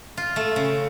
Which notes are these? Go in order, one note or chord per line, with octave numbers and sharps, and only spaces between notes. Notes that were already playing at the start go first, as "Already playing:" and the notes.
F4
A3
C#3